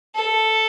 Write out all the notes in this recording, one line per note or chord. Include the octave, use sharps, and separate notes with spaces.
A4